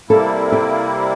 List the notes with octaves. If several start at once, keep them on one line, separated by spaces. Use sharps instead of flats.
C3 G3 A#3 E4 A4
G4